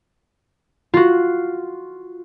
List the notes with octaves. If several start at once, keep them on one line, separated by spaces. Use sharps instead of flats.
F4 F#4